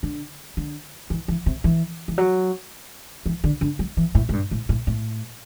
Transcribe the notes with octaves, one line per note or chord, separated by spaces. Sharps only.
D3
D3
E3
E3
C3
E3
E3
F#3
E3
D3
D3
F#3
E3
A2
A2
G2
A2
A2
A2